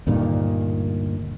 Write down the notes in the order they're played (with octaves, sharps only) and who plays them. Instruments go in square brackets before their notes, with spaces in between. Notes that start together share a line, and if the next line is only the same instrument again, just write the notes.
[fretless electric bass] D2 G2 A#2 D#3